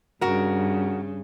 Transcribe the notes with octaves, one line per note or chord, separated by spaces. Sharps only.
G2 C#3 F#4 A#4